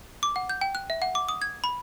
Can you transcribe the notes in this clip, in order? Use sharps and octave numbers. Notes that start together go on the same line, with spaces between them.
D6
F#5
G6
G5
F#6
E5
F#5
D6
D#6
G#6
B5